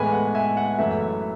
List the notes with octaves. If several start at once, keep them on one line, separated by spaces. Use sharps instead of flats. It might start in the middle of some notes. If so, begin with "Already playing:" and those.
Already playing: A2 E3 G#3 B3 G#5 B5
F#5
E5 G#5
F#5
F#2 E3 A3 E5
E5